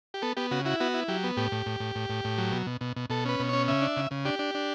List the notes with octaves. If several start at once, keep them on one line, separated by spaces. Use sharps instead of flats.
G4
B3 A4
B3 G4
C#3 F#4
E4 F#4
B3 F#4
E4
F#3 G4
B3
A2 G4
A2
A2
A2
A2
A2
A2
F#3
B2
B2
B2
B2
B2 A4
C#4 B4
B2
C#4 C#5
C#3 E5
D4
C#3
C#3
D4 G4
D4
D4